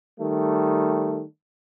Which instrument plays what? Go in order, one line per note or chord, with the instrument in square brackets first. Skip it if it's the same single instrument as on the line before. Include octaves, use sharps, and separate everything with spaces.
[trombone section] D#3 G3 A3